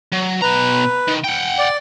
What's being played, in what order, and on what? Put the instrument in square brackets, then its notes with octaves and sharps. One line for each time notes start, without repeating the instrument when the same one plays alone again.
[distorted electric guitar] F#3
[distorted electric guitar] B2 A#5 [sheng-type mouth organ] B4
[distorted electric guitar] D#3
F#5 G5
[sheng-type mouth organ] D5